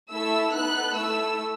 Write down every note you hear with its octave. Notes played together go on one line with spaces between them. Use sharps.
A3 E4 A4 E6
B3 D#4 A4 F#6
A3 E4 A4 E6